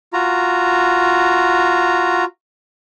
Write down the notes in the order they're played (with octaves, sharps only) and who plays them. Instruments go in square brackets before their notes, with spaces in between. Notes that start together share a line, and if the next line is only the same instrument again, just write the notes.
[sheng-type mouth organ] F4 F#4 A#5